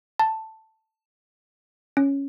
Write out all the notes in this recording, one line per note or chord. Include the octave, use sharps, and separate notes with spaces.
A5
C#4